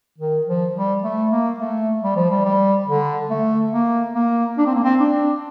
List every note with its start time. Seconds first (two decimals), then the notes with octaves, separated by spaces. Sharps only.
0.18 D#3
0.46 F3
0.75 G3
1.04 A3
1.32 A#3
1.60 A3
2.03 G3
2.16 F3
2.30 G3
2.45 G3
2.88 D3
3.30 A3
3.73 A#3
4.15 A#3
4.58 D4
4.66 C4
4.75 A#3
4.84 C4
5.00 D4